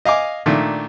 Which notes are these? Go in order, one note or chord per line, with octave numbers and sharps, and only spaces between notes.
D#5 F5 G#5 D6
A#2 D#3 A3 D4